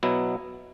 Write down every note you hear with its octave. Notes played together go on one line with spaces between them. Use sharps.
B2 F#3 B3 E4